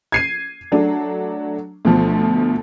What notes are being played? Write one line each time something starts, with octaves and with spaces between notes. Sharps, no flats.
G#6 C7 D#7
F#3 A3 D4
D2 B2 F3